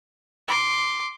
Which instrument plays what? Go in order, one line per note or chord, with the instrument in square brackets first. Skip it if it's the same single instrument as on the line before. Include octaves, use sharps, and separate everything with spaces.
[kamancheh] C6 D6